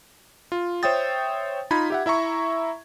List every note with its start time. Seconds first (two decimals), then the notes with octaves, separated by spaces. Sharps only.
0.52 F4
0.83 C5 C#5 E5 G5 D#6 A6
1.71 D#4 F4 B5 G#6
1.90 G4 E5 F#5
2.06 E4 E5 A#5 C#6